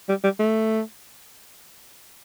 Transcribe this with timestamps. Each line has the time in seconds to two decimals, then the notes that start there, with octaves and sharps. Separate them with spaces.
0.09 G3
0.24 G3
0.40 A3